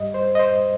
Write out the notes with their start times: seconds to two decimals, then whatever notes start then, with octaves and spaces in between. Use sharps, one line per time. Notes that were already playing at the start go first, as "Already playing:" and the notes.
Already playing: G2 G3 D#5
0.14 C5
0.35 D#5
0.39 C5